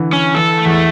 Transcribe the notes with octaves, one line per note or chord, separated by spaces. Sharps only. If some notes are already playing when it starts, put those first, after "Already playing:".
Already playing: D3 E3
C#4
E3 A4
A3
E2